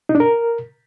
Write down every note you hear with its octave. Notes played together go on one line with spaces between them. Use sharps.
D#4
D4
A#4